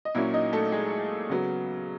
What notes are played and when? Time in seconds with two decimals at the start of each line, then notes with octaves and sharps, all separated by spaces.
0.05 D#5
0.15 A#2 F#3 A#3 C#4 E4 E5
0.34 D#4 D#5
0.53 A3 A4
0.72 G#3 G#4
1.30 C#3 F#3 B3